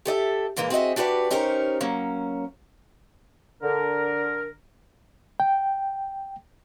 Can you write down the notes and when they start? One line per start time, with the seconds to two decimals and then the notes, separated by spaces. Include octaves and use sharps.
0.05 G4 A4 D#5 E5
0.56 A#2 E3 G#3 A#3
0.70 C4 F#4 G#4 D#5 E5
0.96 D4 F#4 G4 B4 D5
1.31 C#4 D#4 G4 A#4 C5 C#5
1.81 F#3 A#3 C#4
3.62 D3 A#4
5.40 G5